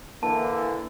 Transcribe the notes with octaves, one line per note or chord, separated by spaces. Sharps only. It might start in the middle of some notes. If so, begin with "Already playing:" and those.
D3 E3 A#3 A5